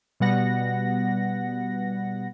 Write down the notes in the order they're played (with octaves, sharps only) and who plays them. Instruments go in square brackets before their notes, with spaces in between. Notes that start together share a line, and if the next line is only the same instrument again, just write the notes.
[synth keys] B2 G3 B3 F#5 A#6